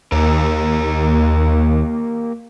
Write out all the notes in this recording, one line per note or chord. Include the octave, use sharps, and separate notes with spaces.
D#2 A#3 G4 A#4